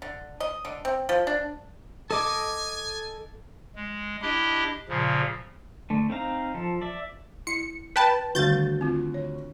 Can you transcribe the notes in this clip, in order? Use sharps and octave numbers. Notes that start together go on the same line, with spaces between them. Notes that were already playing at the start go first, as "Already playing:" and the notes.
D3
D#5
D3
C4
F3
D4
A4 D#5 G#5 D6
G#3
D4 E4 G4 D#5
A#2 C#3 F3
D3 A3
C4 D#4 F5 A#5
F3 A4
D5 E5
E4 C#7
B4 G5 A5
D2 D3 D#3 G3 F#4 G6 A6
C4 F4
C#5